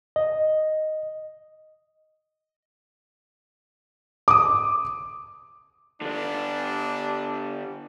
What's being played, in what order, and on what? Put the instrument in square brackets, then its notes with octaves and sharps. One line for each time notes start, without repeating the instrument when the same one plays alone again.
[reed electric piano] D#5
[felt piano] D6 D#6
[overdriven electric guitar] D3 G3 [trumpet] D4